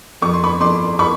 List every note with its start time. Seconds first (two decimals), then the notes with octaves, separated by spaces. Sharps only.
0.22 F2 C#6
0.33 C6
0.44 B5 C#6
0.60 F2 C6 D6
0.99 B5 C#6